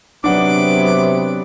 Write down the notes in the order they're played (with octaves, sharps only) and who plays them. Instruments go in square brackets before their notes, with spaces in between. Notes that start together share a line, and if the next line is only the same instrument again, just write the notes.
[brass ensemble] C3 [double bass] F#3 B3 [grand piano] D4 F#5 [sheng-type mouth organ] D6